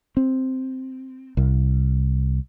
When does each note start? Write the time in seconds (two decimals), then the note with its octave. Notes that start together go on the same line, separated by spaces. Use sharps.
0.17 C4
1.37 C2